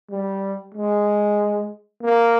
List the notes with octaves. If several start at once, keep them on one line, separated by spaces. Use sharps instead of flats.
G3
G#3
A#3